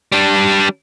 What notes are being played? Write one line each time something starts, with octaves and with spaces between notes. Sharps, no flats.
G3 D4